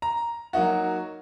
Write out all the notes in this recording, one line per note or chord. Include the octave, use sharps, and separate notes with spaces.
A#5
F#3 A#3 D#4 F#4